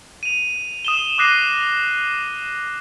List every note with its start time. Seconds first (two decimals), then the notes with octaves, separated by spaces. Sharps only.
0.23 D#7 F7
0.85 D#6 E7 G7
1.18 D6 D#6 F#6 A#6 C7 D#7